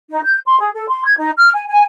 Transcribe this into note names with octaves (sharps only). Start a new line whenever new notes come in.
D#4
G6
C6
G#4
A4
C6
G#6
D#4
F6
G#5
G#5